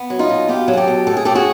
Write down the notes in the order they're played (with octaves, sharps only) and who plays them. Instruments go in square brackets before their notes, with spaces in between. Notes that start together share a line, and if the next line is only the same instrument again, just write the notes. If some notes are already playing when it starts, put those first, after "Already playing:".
Already playing: [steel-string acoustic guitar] B3
F#3
D#4 F4
B2
B3 F4 G4
F#3
G#4
G4 A4
B2
A2 A4
G#4
A2 G4 A4
F#4 G#4